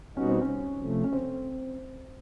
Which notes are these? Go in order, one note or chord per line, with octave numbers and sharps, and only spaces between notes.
B2 G3 B3 C#4 D#4 F#4
C4
C#4
C3 F3 A3
C#4
C4